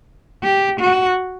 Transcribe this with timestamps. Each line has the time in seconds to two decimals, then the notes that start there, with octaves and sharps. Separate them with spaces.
0.43 G4
0.80 F#4